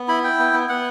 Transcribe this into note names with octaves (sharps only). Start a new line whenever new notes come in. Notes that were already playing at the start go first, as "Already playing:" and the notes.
Already playing: B3
E4 B5
E4 G5
B3
B3
B3 F#5